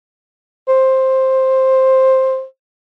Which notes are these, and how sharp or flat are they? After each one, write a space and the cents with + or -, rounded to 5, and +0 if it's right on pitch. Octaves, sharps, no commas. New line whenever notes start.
C5 +10